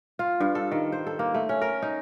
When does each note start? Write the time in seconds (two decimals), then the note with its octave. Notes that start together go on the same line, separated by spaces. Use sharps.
0.19 F4
0.40 G2
0.55 A4
0.71 D#3
0.92 C5
1.07 A4
1.19 A#3
1.34 A3
1.49 C#4
1.61 A#4
1.82 D#4